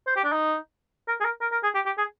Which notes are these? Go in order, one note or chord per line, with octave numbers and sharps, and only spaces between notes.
C5
G4
D4
D#4
A#4
G#4
A#4
A#4
A#4
G#4
G4
G4
G#4